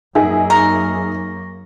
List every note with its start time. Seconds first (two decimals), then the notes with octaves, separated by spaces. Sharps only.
0.15 F#2 A#3 D#4 G#4 E5 G#5
0.50 A#4 C#6 A#6